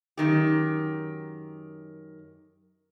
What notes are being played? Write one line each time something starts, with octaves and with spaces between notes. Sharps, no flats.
F#2 D#3 G4